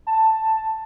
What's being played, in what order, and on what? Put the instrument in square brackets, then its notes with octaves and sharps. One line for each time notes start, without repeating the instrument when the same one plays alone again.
[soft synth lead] A5